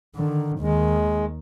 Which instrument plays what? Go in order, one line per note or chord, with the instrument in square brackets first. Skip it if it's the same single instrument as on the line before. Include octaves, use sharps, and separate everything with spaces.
[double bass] D3 D#3
[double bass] D#2 D#3 [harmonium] G#3